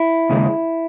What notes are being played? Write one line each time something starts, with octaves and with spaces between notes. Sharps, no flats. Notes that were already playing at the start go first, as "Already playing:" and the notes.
Already playing: E4
D#2 C#3 G#3